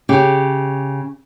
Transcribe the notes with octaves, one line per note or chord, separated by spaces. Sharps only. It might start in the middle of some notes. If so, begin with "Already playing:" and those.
C#3 G4